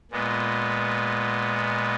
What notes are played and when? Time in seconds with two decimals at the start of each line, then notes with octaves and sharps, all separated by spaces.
0.11 A#2 G#3 B3